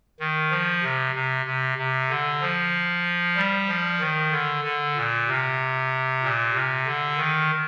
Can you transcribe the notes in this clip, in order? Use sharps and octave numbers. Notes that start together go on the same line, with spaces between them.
D#3
F3
C3
C3
C3
C3
D3
F3
G3
F3
D#3
D3
D3
A#2
C3
A#2
C3
D3
D#3